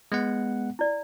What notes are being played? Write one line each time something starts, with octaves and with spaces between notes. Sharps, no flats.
G#3 B3 F#5
E4 D5